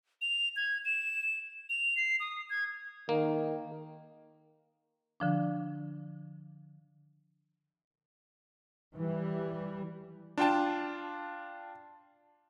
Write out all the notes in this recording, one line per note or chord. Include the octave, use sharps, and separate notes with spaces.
F7
G#6
E7
F7
C7
D#6
G#6
D#3 A#3
D3 F3 D4
E3 G3
D4 F4 G5 A5